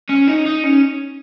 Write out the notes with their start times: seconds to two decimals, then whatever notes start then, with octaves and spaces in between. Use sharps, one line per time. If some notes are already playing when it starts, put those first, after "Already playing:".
0.10 C#4
0.28 D#4
0.46 D#4
0.64 C#4